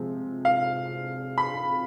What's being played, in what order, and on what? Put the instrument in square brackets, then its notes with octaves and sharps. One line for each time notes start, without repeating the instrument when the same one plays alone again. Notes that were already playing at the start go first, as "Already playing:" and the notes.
Already playing: [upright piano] C3 F3 G#3 C4
F5
B5